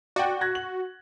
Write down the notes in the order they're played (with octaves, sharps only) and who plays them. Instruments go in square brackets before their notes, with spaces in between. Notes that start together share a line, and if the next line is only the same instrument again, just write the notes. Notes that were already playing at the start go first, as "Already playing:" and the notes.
[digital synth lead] F#4 [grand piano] D5 G5
[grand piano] F#6 G#6 A#6
F#7